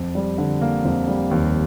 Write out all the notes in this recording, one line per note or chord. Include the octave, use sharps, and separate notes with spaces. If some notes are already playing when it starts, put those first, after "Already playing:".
Already playing: F2
G3
D3
A#3
F2
G3
D#2